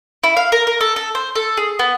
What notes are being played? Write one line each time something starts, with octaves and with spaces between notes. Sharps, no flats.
E4
F5
A#4
A#4
A4
A4
C5
A4
G#4
B3